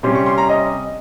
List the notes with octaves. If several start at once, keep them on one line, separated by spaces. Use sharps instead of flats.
C3 G3 C#4 C6
C#6
C6
A#5
D#5